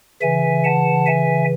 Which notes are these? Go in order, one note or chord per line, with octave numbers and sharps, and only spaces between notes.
C#3 E3 E5 G#5
F#5 A5
E5 G#5